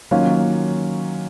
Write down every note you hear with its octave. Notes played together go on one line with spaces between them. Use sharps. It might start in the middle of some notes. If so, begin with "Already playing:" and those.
D#3 F#3 A#3 C#4 F4